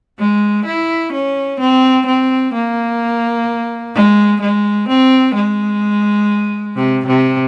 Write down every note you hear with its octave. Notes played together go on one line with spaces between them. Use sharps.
G#3
E4
C#4
C4
C4
A#3
G#3
G#3
C4
G#3
C3
C3